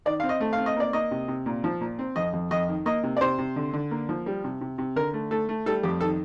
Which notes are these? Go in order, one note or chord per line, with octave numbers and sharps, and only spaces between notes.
D#3 D5
C4 F5
D#5
A3
F5
C4
D#5
A#3 D5
A#3 D#5
C3
C3
A#2
F3
A#2
C4
F2 D#5
F2
F2 D#5
D#3
A#3 D#5
C3
D5
C3 C5
C3
D3
D3
A#3
F3
G3
C3
C3
C3
D3 A#4
A3
A3 A4
A3
G3 A4
F2 G4
D#3 A4